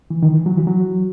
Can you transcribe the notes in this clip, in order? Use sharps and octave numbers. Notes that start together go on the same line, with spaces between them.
E3
D#3
E3
F#3
E3
F#3